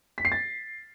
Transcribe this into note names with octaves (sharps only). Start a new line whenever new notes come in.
B6
C7
A6